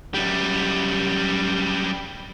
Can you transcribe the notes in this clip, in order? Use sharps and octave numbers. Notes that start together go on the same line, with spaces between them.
F#2 G3